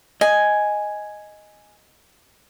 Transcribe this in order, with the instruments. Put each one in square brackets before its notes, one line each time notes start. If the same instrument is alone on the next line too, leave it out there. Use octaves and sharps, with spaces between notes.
[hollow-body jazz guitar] D#5 [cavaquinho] G#5